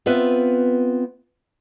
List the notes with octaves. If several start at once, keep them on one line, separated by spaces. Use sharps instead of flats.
B3 C4 F4 B4 E5